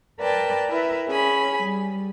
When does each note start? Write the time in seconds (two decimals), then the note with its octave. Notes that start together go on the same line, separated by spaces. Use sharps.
0.19 A#4 B4 D5 G5 A5
0.69 E4 A#4 B4 E5
1.08 C#4 G#4 G#5 B5
1.63 G3